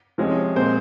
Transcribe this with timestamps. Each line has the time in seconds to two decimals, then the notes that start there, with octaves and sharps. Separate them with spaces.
0.18 C3 F3 G#3 C#4
0.56 A#2 G#3 C4 C5